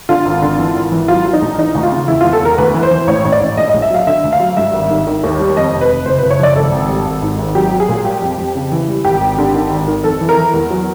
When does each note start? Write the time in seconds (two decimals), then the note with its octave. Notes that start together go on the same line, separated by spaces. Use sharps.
0.09 D3 F4
0.26 G#1
0.42 D3
0.58 E3
0.75 G#1
0.92 E3
1.08 F#3 F4
1.25 F#3
1.33 D#4
1.42 A#1
1.58 E3 D#4
1.75 D2
1.83 F4
1.92 C#3
2.08 E2 E4
2.21 E2 F4
2.33 A4
2.41 E2 A#4
2.58 D2 B4
2.74 E3
2.83 C5
2.91 E3
3.07 A1 C#5
3.25 A1
3.32 D5
3.41 A1
3.57 A#1 D#5
3.69 D#5
3.74 A#1
3.82 E5
3.90 F#3 F5
4.07 D3 E5
4.24 D2
4.33 F5
4.40 F#3
4.57 G2 E5
4.73 G#1
4.90 D#3
5.07 D#3
5.23 D#2
5.40 G3
5.56 F2 D#5
5.73 F1
5.81 B4
5.89 F1
6.06 F#1 C5
6.18 B4
6.22 F#1
6.30 C#5
6.39 F3 D5
6.55 G#1 A4
6.72 G#1
6.89 G3
7.06 G#1
7.22 G#2
7.39 G#1
7.55 F#3 G4
7.71 F#3
7.80 G#4
7.88 A#2
8.05 G3 G4
8.21 F2
8.38 F2
8.55 C#3
8.72 E3
8.88 G3
9.05 G#1 G4
9.21 G#1
9.38 D3
9.54 D#3
9.71 G#1
9.88 D#3
10.04 F2 A4
10.21 E3
10.29 A#4
10.37 E3
10.54 E2 A#4
10.71 F#3